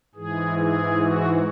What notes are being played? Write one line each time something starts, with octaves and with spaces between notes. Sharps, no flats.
G#2 E3 G#4
G#4
F#4